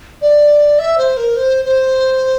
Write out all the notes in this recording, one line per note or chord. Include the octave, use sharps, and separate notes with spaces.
D5
E5
C5
A#4
C5
C5